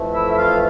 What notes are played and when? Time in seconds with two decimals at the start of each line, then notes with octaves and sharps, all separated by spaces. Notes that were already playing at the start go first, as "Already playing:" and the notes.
Already playing: F2 E3 A3
0.14 E4 E5
0.31 E5
0.38 F4 F5